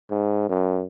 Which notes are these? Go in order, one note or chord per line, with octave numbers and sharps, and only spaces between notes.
G#2
F#2